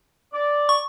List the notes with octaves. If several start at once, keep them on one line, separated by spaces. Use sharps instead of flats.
D5
C#6